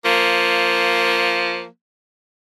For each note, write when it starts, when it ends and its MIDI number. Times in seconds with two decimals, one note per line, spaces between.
0.05 1.66 53
0.05 1.67 58